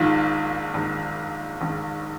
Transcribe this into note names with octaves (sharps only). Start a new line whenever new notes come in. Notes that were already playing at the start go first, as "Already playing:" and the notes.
Already playing: A#1 G#2 D#3 F4
A#1 G#2 D#3
A#1 G#2 D#3